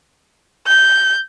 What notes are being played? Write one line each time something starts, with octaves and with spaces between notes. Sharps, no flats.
G6